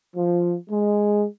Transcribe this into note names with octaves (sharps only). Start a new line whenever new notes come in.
F3
G#3